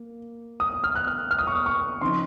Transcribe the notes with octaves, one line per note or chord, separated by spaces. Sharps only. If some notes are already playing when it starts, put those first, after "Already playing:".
Already playing: A#3
D#6
F6
F#6
F6
F6
D#6
C#6
D#6
C#6
C#3 F3 C4 D#4 C6